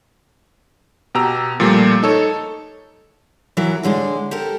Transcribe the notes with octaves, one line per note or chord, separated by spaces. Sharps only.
B2 G4 A#5 E6
A#2 F3 G3 A3 A#3
D#4 A4 C#5
E3 F#3 A#4
A2 D3 G#3 G#4
G4 A4 A#4